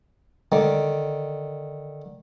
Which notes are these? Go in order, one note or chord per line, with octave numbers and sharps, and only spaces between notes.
D3 D#3